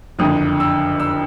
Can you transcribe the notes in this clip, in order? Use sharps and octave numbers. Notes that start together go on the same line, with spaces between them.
F#1 F2 D3 D#6
E6
E6